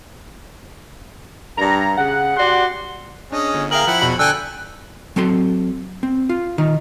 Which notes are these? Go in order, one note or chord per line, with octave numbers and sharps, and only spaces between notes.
G2 A#5
C#3 F#5
F#4 G4 D5 F#5 C6
C#4 D4 G#4 D#5
G1
G#4 A#4 E5 F5 G5 F6 F#7
F3 E4 F#5 G5
E2 B2 B5
D3 A4 D5 G5 G#5 E6 F#6
F#3 C4 A4 C6
C4
F4
D#3 D#4 F4